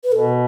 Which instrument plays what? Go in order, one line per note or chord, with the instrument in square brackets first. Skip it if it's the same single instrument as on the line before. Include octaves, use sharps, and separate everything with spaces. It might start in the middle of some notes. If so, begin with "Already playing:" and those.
[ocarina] B4
[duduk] B2 [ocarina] A4